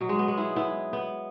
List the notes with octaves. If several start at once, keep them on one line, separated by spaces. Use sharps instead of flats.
B2 F#3
G#3
B3
G#3
E4 G#4
B3 E4
B3